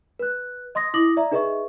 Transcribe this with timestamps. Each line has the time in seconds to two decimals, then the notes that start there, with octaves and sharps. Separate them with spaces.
0.19 B4 F#6
0.75 D#5 C6 D#6 A#6
0.94 E4 D6 D#6 A#6 F#7
1.17 D5 E5 A#5
1.31 D#4 G#4 B4 D#5 E5 C#6